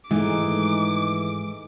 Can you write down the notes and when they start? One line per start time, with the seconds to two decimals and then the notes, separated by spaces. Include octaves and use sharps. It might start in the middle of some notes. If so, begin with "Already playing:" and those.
0.11 G#2 D#3 E3 G#3 A3 D#4 D6